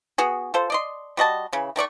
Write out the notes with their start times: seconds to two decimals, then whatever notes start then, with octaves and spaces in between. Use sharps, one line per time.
0.18 B3 F#4 G#4
0.54 F4 A4 C5
0.70 D5 D#5 C6
1.17 G3 F#4 D#5 A5
1.53 C#3 E3
1.76 D#3 A3 D5 C#6